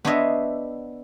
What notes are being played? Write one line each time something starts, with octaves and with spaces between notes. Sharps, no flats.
B3 D4 C5 C#5 D#5 E5